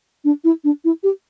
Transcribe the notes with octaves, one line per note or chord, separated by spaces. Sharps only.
D4
E4
D4
E4
G4